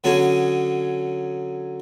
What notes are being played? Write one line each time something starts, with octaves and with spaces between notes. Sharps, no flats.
D3 F#3 C#4 G#4